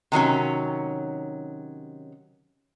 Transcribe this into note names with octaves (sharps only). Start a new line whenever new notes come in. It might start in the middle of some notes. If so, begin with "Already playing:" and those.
C3 D#3 F#3 C#4